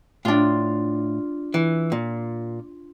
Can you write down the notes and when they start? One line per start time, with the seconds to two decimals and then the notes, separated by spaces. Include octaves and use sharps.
0.25 A2 D4 F4
1.54 E3
1.92 A#2